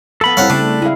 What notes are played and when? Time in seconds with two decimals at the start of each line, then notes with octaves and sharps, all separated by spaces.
0.21 F3 B3 A4 B5
0.37 F2 C3 G3 C4 E4 C#5 F5 F#5
0.50 C#3 A3 D4
0.82 G#3 E4 F5